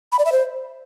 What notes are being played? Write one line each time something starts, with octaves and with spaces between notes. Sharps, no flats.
B5
D5
E5
C5